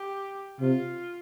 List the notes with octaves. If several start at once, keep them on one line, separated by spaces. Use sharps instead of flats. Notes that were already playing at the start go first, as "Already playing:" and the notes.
Already playing: G4
C3 F4